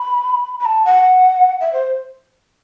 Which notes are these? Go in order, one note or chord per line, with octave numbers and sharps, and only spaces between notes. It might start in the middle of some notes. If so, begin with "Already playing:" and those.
Already playing: B5
B5
A5
F#5
E5
C5